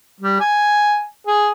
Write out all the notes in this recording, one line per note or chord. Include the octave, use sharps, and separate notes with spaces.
G3
G#5
G#4